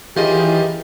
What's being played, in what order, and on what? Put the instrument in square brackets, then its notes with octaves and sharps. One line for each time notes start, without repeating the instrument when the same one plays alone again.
[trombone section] F#2 E4 G#4 [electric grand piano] D#3 F4 D#5 [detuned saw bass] E3 [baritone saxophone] G4